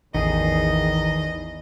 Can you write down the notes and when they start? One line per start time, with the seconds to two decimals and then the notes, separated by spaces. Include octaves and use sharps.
0.15 A1 E2 D#3 G#4 D#5